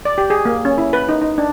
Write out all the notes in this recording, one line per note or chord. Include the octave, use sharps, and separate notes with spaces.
D5
G4
G#4
A#3
C#4
E4
B4
D#4
D#4
D4